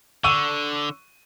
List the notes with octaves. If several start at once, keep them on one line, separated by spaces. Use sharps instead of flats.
D3 C#6 E6 D#7